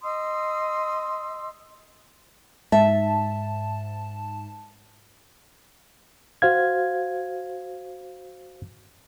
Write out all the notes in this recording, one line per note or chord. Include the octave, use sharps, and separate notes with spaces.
D#5 C6 D#6 E6
G#2 E5 A5
F#4 C5 F5 G#6